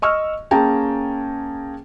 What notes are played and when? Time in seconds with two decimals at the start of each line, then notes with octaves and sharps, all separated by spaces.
0.02 D#5 C#6 E6 F6
0.51 A#3 C#4 G#4 G5 A5 A#5